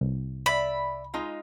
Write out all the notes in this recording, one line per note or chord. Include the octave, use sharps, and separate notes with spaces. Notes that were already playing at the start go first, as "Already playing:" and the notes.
C2
D5 E5 B5
G#3 D#4 F4